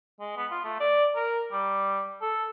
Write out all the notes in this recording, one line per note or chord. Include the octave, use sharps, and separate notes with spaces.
G#3
B3
F4
A3
D5
A#4
G3
A4